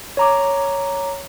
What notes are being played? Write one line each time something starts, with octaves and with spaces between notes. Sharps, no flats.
C#5 A#5 D6